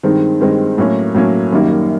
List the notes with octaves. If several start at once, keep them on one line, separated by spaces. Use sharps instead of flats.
G2 D#3 G#3 C4 D#4
G2 D#3 G#3 C4 D#4
A2 F#3 A#3 C#4
A2 F#3 A#3 C#4
F#2 D#3 G3 A#3